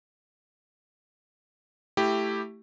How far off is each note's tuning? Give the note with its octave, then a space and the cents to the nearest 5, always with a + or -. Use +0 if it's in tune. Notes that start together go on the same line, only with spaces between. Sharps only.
A3 +0 E4 +0 G4 +0